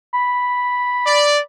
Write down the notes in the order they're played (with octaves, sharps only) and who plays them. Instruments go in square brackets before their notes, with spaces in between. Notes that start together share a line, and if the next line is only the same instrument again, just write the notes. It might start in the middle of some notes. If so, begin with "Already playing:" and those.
[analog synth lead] B5
[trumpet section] D5